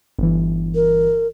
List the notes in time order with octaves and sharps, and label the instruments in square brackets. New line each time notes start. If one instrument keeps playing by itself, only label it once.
[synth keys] G1 E3
[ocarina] A#4